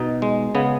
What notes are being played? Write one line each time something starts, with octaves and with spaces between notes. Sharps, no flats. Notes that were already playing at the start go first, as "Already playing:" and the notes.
Already playing: B2 D#4
G#3
C#3 B3